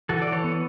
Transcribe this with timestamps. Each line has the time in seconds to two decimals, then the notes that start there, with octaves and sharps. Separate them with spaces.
0.09 E3 F#4 A4
0.22 D5
0.27 E3
0.32 A4 C#5
0.44 B3